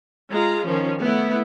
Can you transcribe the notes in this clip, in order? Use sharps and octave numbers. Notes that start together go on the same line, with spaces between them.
G#3 F4 A#5
D#3 F3 C#4
A3 B3 E4